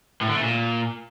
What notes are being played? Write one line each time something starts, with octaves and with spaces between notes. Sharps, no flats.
A2
D3
A3
A#2